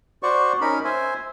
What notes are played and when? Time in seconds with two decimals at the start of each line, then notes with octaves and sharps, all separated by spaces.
0.23 F#4 C5 D5 C#6
0.61 C#4 D#4 A#4 B5
0.85 C5 E5 G#5